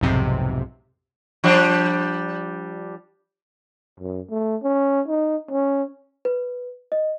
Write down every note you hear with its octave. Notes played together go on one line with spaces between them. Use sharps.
B1 F2 G#2 C3
F3 G3 D4
F#2
A3
C#4
D#4
C#4
B4
D#5